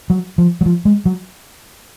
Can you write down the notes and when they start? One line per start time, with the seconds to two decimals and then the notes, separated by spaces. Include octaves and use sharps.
0.10 F#3
0.38 F3
0.61 F#3
0.66 F3
0.85 G#3
1.06 F#3